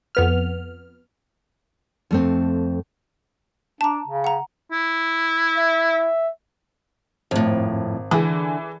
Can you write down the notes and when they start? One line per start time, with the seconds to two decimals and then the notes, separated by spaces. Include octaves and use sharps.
0.15 F2 B3 F6
2.11 F2 A3 C4
3.81 D4 A5 A#5
4.07 C#3
4.24 F#5 A#5
4.72 E4
5.57 E5
7.31 G#1 F2 A2
8.11 D3 E3 G#4